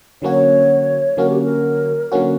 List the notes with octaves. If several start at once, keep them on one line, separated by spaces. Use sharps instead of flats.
D3 F#3 A#3 C#4 F#4 C#5
D3 F#3 A#3 C#4 F#4 A#4
G4
A#4
D3 F#3 A#3 C#4 F#4